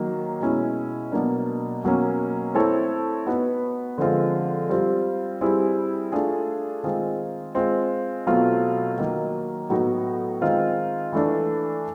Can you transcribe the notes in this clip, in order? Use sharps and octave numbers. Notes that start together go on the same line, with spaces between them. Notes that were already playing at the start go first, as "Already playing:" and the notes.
Already playing: D#3 F#3 A#3
B2 G#3 C#4 E4
B2 F#3 A#3 D4
B2 F#3 A#3 C#4
A3 C4 E4 A4 C#5
B3 D#4 F#4 B4
D3 F3 G#3 C4 F4
G3 C4 F4
G3 C4 E4 G#4 C5
A3 D4 F4 G#4
D#3 G#3 C4 F4 G#4
G#3 C4 F4
B2 F#3 A3 C4 F4
D#3 F#3 A#3
A2 F#3 B3 D#4 F#4
D#3 G#3 C4 F4
E3 A3 D4